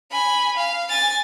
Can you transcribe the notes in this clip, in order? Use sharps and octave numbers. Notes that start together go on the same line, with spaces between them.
G#5 B5
F5
G#5 A6